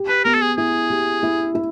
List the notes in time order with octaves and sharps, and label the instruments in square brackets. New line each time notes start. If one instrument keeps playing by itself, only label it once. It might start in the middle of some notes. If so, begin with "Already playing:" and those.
Already playing: [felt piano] G4
[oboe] B4
[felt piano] B3 [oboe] A#4
[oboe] A4
G#4
[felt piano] E4 [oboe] G#4
[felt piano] G4
E4
E4